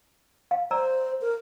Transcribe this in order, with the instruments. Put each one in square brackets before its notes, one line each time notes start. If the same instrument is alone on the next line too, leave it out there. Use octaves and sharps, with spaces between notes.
[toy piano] F5
[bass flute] C5 [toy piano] D5 A#5 E6
[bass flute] A#4